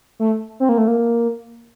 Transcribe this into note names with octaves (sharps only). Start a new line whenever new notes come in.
A3
C4
A#3
A3
A#3